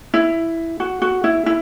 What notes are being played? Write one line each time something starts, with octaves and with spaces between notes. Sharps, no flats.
E4
F#4
F#4
E4
E4